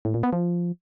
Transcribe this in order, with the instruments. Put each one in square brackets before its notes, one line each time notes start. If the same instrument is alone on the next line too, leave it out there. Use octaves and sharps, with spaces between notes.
[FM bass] A2
A#2
B3
F3